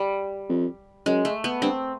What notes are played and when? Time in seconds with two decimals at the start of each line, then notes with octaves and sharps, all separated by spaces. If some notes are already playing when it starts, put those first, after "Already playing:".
Already playing: G3
0.49 F2
1.06 F#2 G#3
1.25 A3
1.44 B3
1.62 G2 C4